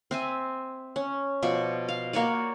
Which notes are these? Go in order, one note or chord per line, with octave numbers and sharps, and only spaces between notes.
C4 E5 G#5
C#4
B2 F3 D5 C#6
F5
A#3 F#4 C#5 D5